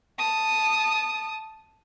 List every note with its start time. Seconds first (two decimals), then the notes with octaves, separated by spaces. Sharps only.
0.19 A5 D#6